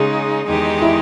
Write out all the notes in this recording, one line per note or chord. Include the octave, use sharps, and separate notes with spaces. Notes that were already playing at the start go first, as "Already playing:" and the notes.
Already playing: C#3 G#3 D#4 G#4
E2 D#3 G#3 D#4 G4
E4